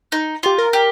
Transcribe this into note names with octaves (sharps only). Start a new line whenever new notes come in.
D#4
F4 G4
A#4
G4